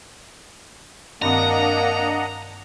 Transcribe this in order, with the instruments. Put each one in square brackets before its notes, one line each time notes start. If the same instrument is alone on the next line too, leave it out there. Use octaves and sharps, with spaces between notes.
[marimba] G2 D#3 C4 [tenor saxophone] A#3 [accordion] D4 D#5 F#5 [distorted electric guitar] A#5